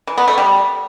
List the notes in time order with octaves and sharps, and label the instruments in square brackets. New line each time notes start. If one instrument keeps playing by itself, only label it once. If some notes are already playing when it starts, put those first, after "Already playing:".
[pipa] E3
B3
A3
G3